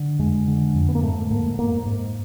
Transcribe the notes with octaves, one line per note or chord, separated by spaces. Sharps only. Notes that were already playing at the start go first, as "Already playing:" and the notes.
Already playing: D3
F2 G#3
D3
F2
B3
A#3
G#2 A3
G#2 A#3
G#2 A#3
G#2